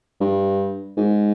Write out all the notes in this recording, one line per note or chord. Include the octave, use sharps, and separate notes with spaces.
G2
G#2